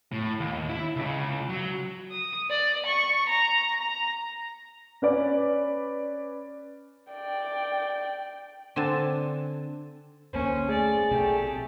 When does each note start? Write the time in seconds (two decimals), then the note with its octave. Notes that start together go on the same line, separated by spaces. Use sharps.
0.12 A2
0.40 D#2
0.69 E4
0.96 C#2 C#3
1.49 F#3
2.11 D#6
2.50 D5
2.86 C#6
3.29 A#5
3.82 A#5
5.02 C#4 B4 D5
7.13 D5 G5
8.76 D3 C4 G#5 A5
10.33 F1 D2 A#3 C#4 C5
10.68 A3 G#4 D5
11.11 A#1 B2 A3 C4 G4